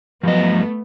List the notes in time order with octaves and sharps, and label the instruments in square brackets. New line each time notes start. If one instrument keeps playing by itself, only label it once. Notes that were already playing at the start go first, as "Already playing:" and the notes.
[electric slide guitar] G2 D#5 [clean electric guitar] F3 F#3 [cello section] A3 B3